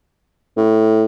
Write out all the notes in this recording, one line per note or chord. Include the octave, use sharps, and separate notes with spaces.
A2